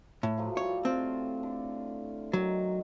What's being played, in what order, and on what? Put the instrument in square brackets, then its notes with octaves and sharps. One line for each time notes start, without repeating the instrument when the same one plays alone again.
[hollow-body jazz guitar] A2
[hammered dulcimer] F3 F#3 A3
[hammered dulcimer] A2 G3 [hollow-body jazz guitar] C#5
[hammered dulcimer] A3 F4 [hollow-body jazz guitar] C4
[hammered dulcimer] D3
[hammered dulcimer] D#3 [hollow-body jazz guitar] F#3